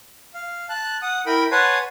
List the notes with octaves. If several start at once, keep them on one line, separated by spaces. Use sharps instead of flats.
F5
A5 F#6
F#5 D#6
E4 A#4 G5 B5
B4 C#5 F#5 G#5 A5 C6